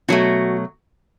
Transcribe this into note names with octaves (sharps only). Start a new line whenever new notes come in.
B2 F#3 A3 F#4